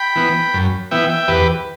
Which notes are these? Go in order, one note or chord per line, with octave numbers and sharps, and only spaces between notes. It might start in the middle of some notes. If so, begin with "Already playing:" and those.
Already playing: G5 B5
E3 B3
F#2
E3 B3 E5 G5
E5 G5
E2 G4 B4